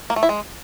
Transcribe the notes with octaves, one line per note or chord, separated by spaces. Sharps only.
A#3
A3
E4
G#3